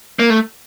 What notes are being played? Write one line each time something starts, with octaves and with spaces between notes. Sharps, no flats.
A#3
A3